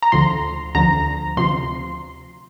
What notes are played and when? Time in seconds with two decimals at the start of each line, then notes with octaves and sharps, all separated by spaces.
0.03 A#5
0.12 D2 D3 F3 C6
0.75 D2 D3 F3 A#5
1.37 D2 C3 F3 C6